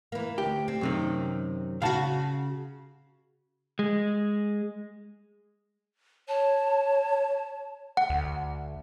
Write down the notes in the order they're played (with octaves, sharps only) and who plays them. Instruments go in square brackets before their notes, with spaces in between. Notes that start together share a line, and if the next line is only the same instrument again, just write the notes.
[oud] E3 A#3
[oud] D2 [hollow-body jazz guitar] G4
[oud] C4
[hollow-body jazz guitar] F#2 C3 D#3
[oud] C#3 F#4 [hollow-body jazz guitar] F5 F#5 A5
[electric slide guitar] G#3
[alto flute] C#5 [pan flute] A5
[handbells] F#5
[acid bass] D2